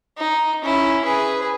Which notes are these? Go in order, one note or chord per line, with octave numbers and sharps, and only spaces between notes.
D#4
C#4 E4
G#4 B4